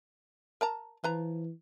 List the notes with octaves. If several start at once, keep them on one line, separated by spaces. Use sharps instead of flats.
A#4 A5 A#5
E3 F3 B4 A#5